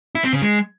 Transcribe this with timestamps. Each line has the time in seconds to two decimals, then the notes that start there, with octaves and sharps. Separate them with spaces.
0.15 E4
0.24 C4
0.33 C#3
0.42 G#3